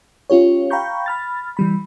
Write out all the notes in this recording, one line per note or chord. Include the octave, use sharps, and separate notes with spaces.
C#4 F4 G4 C#5
F5 G5 A#5 B5 C#6 G6
B5 F6 A6
E3 G3 B5